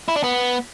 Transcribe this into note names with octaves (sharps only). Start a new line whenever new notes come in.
E4
D4
B3